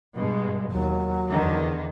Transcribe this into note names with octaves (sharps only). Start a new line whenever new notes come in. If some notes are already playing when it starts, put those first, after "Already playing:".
G2 B2 G#3
D#2 F#3
E2 D3 D#3